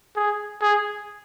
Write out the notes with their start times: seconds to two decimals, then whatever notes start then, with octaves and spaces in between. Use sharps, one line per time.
0.16 G#4
0.61 G#4